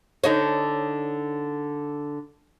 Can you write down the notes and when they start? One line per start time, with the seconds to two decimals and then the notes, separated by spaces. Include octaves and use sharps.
0.24 D3 D#4 C#5